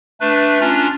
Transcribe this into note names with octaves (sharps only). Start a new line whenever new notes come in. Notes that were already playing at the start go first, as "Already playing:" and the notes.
A3 D4 B4
C#4 D4 F4 A#5 F#6